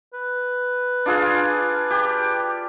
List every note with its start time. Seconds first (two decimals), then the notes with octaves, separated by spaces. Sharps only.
0.14 B4
1.06 D4 F4 G#4
1.90 G4